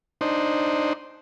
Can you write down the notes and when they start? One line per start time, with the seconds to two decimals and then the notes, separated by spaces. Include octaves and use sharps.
0.21 D4 D#4 C5